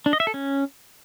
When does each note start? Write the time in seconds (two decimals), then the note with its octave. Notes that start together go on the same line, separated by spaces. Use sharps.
0.06 D4
0.13 D#5
0.20 E5
0.27 A4
0.34 C#4